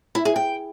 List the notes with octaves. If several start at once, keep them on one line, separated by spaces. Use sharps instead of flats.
E4
G#4
G5